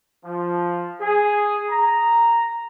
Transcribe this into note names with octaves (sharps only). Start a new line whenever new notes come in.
F3
G#4
A#5